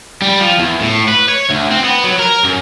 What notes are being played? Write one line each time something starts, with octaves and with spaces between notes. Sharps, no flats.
G3
F3
E2
A2
B4
C#5
D2
C4
B3
F#3
A#4
F#2